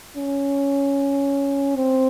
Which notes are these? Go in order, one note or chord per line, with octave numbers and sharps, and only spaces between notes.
C#4
C4